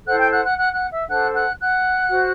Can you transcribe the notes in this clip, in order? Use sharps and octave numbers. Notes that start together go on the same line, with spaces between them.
E4 A4 C5 F#5 F#6
G5 G6
F#5 F#6
F#5 F#6
F#5 F#6
F#5 F#6
E5 E6
D4 A4 C5 F#5 F#6
F#5 F#6
F#5 F#6
F#4 C5